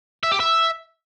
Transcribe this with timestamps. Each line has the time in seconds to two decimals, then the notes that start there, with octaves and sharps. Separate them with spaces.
0.23 E5
0.32 G4
0.40 E5